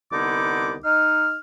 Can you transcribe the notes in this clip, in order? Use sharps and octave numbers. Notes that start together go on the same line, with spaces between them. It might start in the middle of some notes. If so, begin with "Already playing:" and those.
C2 D3 B3 D#4 D6
D#4 F6